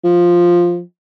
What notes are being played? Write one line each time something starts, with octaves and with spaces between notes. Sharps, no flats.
F3